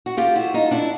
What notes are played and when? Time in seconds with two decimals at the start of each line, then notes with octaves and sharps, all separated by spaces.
0.06 F#4
0.17 F4 G4
0.36 E4 F#4
0.54 D#4 F4
0.71 D4 E4